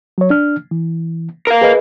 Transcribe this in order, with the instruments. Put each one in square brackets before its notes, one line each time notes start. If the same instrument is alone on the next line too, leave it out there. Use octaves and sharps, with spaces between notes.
[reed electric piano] F#3 C#5
D4 F6
E3
[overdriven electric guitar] A#4 F5
[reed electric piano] G#4 B4 D#5